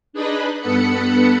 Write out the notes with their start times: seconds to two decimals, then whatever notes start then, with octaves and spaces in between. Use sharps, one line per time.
0.13 D4 D#4 G#4 B4 D#5 B5
0.60 G2 B3 A4 F#5 B5 C#7